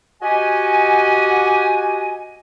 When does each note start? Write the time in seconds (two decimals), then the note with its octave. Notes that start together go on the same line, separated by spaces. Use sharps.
0.22 F#4 G4 D#5 G#5